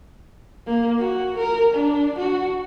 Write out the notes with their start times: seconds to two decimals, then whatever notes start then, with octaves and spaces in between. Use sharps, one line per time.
0.67 A#3
0.99 F#4
1.38 A#4
1.74 D4
2.19 F#4